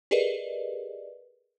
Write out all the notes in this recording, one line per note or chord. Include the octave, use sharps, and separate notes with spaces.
G4 G#4 A#4 B4 D5 D#5